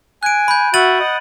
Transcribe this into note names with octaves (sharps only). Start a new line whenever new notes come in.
G#5 F#6 D7
B5 G6
F#4 E5 F#5 A6 D#7 F#7
D#5 F#5